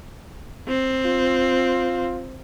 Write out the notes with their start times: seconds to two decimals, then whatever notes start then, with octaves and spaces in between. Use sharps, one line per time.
0.68 C4
1.05 F4